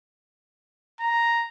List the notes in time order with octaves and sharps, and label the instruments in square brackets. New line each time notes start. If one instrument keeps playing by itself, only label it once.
[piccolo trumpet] A#5